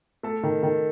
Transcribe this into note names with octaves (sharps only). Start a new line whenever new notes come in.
A3 A4
D#3
D#3